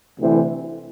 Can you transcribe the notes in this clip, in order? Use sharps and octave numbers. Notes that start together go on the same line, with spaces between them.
D2 C3 E3